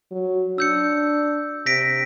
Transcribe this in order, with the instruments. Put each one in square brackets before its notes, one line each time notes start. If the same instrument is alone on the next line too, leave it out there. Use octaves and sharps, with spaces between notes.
[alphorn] F#3
[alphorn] D4 [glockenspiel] E6 G6 C#7
[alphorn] C3 [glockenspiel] A#6 B6 D7